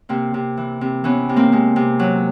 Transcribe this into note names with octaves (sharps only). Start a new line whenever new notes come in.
C3 A#3 C4
C3
E3
C3
E3 B3 C#4
C3
A#3 C4
C3 G#3
C3
F#3